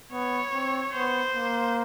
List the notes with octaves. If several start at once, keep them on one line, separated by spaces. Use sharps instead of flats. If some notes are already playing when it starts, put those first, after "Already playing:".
B3 C#5
C4
B3 C5
A#3